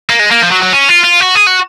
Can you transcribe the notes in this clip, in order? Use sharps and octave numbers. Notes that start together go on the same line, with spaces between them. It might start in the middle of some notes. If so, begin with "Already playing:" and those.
A#3
G#3
A#3
F3
F#3
F#3
C#4
F4
F4
F#4
G#4
F#4